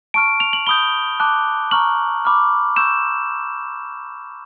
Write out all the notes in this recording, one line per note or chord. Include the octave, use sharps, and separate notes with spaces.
A5 C#6 F6 D7
F7
F#7
B5 D#6 G6 G7
A5 D6 F#6
A#5 C#6 F6 F#7
B5 D6 F6
C#6 E6 G6 E7